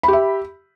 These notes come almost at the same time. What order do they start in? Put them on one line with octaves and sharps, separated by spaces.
B5 G4 E5